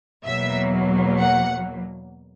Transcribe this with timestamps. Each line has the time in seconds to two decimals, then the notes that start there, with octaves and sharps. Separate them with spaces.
0.24 E2 B2 F#3 A#3 E5
1.19 F#5